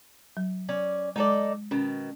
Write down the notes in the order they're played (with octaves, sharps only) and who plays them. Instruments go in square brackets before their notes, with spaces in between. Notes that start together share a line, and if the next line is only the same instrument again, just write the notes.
[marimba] F#3
[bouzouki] C#4 D5
[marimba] G#3 [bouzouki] D#4 A4 D5
[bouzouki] B2 D#3 [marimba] C#4